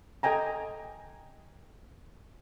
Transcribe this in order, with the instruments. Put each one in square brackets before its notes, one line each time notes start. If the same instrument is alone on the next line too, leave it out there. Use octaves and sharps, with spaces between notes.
[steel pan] A4 D#5 G5 G#5 A#5